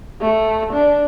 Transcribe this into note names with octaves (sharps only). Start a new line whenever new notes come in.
A3
D4